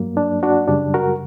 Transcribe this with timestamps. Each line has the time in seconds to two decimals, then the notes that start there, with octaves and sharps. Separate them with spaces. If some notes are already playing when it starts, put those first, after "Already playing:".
Already playing: G2 F#3 A#3
0.17 D4
0.43 D4 F#4
0.68 F#2 C#3 G3 D4
0.94 F#4 A#4